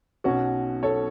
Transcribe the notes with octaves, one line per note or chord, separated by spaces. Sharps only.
B1 B2 F#3 C#4 F#4
A4 C#5